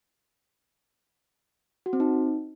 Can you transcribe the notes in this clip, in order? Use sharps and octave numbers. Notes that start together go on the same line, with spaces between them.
F#4
C4
D#4